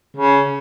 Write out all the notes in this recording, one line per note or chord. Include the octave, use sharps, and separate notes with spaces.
C#3